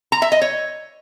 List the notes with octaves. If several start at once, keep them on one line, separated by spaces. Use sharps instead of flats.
A#5
E5
D#5
C#5